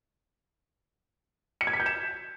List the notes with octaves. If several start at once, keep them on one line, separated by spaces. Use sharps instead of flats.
C#7
G#6
B6
G6
E7